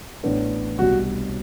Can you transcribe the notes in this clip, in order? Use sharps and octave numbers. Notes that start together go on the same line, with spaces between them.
A1 A2 E3 B3 D4
C2 B2 G3 F#4